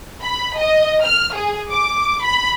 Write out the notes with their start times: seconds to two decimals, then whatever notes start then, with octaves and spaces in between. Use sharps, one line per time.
0.21 B5
0.58 D#5
1.03 F6
1.35 G#4
1.71 D6
2.24 B5